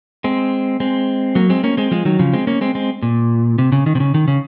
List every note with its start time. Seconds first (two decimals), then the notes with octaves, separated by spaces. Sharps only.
0.24 G#3 C4
0.80 G#3 C4
1.35 F#3 A#3
1.50 G#3 C4
1.64 A#3 C#4
1.77 G#3 C4
1.91 F3 G#3
2.05 D#3 F#3
2.19 C#3 F3
2.33 G#3 C4
2.47 A#3 C#4
2.61 G#3 C4
2.75 G#3 C4
3.02 A#2
3.58 C3
3.72 C#3
3.86 D#3
3.95 C3
4.00 C#3
4.14 D#3
4.28 C#3